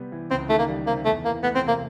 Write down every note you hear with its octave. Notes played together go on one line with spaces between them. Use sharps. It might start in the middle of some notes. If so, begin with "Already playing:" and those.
Already playing: C3 G3 B3
E3
C#2 C4
D#3 A3
A#3
G3
C3 A#3
E2 A3
E3 A#3
A3 B3
C4
C3
A#3